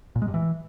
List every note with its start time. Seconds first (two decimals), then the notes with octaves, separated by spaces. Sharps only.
0.16 A#2
0.22 G#3
0.28 G2
0.34 E3